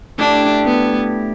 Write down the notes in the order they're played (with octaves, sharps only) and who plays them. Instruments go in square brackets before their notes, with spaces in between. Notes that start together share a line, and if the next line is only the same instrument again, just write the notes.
[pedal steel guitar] A3 E4 G4 [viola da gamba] D4
[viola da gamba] B3